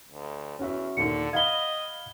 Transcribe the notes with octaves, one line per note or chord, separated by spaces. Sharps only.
D2
E2 C#4 F#4 E5
D#2 A#2 D3 C#7
D#5 F5 F#5 B5 G#6 G7